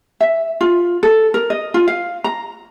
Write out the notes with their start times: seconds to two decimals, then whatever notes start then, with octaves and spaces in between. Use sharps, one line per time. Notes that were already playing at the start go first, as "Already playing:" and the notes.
0.20 E5
0.61 F4
1.03 A4
1.34 A#4
1.50 D#5
1.74 F4
1.88 F5
2.24 A#5